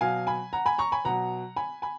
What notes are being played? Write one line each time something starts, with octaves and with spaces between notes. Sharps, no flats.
B2 F#3 F5 G#5
G#5 B5
F#5 A#5
G#5 B5
A#5 C#6
G#5 B5
B2 F#3 F#5 A#5
G#5 B5
G#5 B5